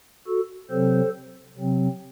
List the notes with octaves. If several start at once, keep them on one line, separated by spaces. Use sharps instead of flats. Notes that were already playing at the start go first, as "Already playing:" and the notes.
F#4 A4
C3 F#3 C4 A4 C5
C3 F#3 C4